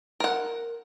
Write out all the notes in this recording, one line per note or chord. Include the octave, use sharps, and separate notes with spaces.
A#4 F#5